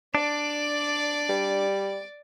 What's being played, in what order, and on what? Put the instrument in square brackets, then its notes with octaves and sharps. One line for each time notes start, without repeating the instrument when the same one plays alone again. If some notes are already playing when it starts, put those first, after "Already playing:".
[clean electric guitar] D4 [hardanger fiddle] D5 D6
[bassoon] G3